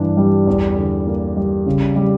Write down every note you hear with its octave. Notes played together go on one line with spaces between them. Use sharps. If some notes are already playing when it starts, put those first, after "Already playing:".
Already playing: G2 E3 D4
G3
E2
D3
A#3
G3
C#3
G3